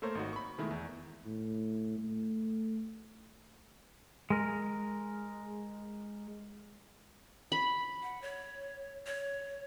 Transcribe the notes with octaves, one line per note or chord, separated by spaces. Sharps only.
A3 A#3 A4 A#4 C5 C#5
G#1 D#4 F#4
B5 C#6
B2 D#3 G#3 A3 E4
E2
A2
A3
G#3 A#4
B5
F#5
C#5
C#5